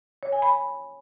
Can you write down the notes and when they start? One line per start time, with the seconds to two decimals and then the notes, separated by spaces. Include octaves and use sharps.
0.23 C#5
0.32 G#5
0.42 B5